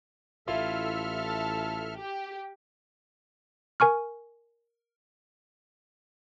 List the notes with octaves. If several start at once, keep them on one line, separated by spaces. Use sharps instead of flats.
A1 E4 F4 A4 E5 F6
A5
G4
A#4 G#5 C#6 F6